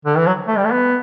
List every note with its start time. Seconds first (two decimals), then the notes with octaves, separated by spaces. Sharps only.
0.05 D3
0.17 E3
0.27 F#3
0.47 A3
0.57 G3
0.64 A3
0.71 B3